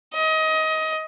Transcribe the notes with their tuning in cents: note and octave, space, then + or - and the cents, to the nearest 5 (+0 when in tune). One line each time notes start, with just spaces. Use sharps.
D#5 +25